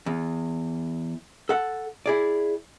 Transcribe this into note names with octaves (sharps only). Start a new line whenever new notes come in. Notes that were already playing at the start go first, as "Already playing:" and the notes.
E2
A4 F#5
E4 G#4 D5